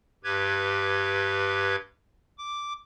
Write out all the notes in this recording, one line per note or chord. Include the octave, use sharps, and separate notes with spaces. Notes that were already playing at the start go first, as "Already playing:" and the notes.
G2 G4 B4 G#6
D6